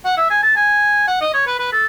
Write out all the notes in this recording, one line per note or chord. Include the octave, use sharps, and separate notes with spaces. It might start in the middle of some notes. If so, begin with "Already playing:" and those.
F#5
E5
G#5
A5
G#5
F#5
D#5
C#5
B4
B4
A4